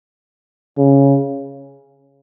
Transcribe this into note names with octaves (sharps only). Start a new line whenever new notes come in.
C#3